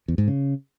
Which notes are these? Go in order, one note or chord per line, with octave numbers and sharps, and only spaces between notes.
E2
G#2
C#3